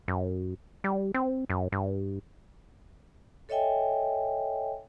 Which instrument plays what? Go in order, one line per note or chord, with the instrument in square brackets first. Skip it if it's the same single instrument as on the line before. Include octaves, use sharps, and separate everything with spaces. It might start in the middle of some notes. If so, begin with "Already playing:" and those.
[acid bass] F#2
G3
C4
F#2
G2
[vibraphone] A4 C#5 D#5 E5 G5 G#5